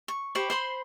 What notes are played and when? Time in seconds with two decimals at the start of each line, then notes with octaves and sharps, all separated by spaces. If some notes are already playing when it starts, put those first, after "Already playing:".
0.08 C#6
0.35 G4 C5 B5 C#6
0.50 C5 B5 C6